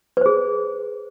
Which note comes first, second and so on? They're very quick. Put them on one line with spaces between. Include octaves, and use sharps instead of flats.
B4 C5 G#4